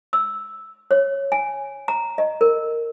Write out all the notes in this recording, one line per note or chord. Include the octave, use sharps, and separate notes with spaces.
E6
C#5
G#5
A#5
D#5
A#4